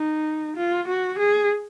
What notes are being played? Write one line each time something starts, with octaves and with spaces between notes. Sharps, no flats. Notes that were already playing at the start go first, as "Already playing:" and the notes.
Already playing: D#4
F4
F#4
G#4